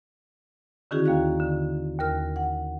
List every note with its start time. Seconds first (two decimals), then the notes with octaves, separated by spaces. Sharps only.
0.91 D3 D#3 C#4 E4 F#4 G#4
1.06 D#2 A#3 F5 F#6
1.40 D3
2.00 D#2 A#4 F6
2.36 F#5